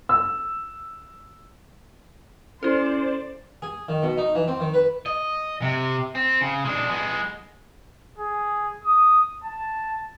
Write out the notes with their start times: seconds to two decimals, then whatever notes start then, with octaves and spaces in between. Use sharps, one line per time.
0.09 E6
2.63 C#4 E4 A4 C5 D5
3.62 G#4
3.88 D#3
4.02 B2
4.18 D#4
4.35 E3
4.48 C4
4.60 D#3
4.74 B4
5.06 D#5
5.62 C3
6.15 C4
6.41 C#3
6.64 G#3 D4
6.90 G#3 B3
8.18 G#4
8.85 D#6
9.44 A5